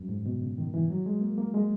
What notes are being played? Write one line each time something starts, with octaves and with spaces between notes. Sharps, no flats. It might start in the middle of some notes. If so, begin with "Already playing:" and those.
Already playing: F#2
G#2
B2
C#3
D#3
E3
F#3
G#3
A#3
A#3
G#3